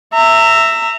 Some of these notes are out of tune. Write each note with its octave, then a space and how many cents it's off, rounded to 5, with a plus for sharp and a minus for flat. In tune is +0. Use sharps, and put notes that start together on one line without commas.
E5 +5 A#5 -25